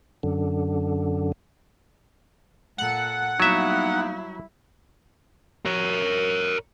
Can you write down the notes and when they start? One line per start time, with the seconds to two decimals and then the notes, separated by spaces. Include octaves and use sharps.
0.23 F#2 D3
2.78 A#2 A4 F#5
3.40 F#3 G3 A#3 B3 D#4 E4 E5
5.66 A#4 C#5